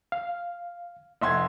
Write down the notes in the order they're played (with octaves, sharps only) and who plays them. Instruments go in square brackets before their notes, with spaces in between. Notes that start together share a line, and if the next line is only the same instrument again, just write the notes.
[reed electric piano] F5
[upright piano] F1 C6 G#6 [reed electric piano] D#5 E5 F#5